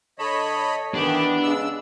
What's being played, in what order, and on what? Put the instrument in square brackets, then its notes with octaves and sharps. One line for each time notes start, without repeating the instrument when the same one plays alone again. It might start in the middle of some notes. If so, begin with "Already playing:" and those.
[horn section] D3 A4 A5 [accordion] C#5 D#5 B5
[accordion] D#3 E3 G4 [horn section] B3 [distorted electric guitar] D4
[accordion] C#3 G#3 E6